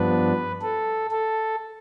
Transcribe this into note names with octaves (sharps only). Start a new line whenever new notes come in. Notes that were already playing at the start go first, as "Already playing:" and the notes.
Already playing: G2 F3 B3 D4 B4
A4
A4